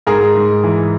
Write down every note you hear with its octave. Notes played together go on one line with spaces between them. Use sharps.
G#2 G#4 A#4
G#2
E3